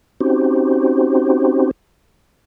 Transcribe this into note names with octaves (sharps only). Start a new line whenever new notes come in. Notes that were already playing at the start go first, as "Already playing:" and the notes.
C4 C#4 D#4 F#4 G4 C5